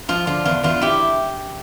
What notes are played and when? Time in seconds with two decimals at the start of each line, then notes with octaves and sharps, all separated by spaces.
0.09 F3 F4
0.27 D3 F4
0.45 E2 F4
0.63 E2 F4
0.82 E4 G4